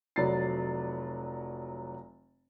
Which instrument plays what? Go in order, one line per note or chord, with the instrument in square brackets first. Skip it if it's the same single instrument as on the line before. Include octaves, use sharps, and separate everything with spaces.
[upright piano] F1 F#3 D5 B5 A6 C7